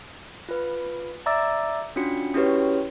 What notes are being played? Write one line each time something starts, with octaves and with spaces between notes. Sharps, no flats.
F4 B4
D5 E5 A#5 D6 E6 A6
C#4 D4 F4 F#4 C#7
C#4 E4 F#4 G4 B4 C#5